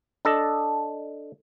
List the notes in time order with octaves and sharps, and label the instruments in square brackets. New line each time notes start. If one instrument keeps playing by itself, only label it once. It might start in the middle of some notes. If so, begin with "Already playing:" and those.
[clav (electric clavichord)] D4 A4 D#5